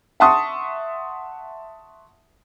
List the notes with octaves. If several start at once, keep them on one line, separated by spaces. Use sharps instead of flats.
E5 F#5 A5 C6 C#6 D#6